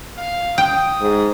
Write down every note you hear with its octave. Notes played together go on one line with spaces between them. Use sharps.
F5
G5 D#6
G#2